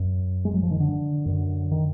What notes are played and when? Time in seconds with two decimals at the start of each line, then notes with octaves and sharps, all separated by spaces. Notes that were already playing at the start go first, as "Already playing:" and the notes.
Already playing: F#2
0.45 G#3
0.54 F#3
0.63 F3
0.71 D#3
0.80 D3
1.26 F#2 D3
1.71 D#3